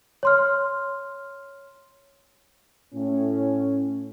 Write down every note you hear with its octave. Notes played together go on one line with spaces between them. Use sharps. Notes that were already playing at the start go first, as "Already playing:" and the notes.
C#5 C6 F6
A2 C#4